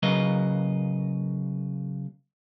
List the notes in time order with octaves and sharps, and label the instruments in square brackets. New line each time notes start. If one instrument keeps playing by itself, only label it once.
[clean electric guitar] C#3 F#3 A#3 B4 D#5